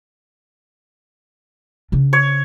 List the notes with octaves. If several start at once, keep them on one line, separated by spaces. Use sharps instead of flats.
C#3 D4
C#5